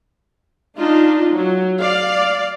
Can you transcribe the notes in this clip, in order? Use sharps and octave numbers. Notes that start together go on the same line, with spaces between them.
D4 D#4 F4
F#3
D5 F5